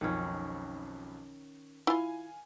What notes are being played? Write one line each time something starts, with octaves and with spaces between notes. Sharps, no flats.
B1 F2 D#3 F3 C#4
E4 F4 F5 G#5